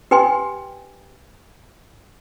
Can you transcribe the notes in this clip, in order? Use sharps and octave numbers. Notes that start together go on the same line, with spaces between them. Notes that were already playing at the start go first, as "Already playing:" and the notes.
G4 B4 G5 G#5 C6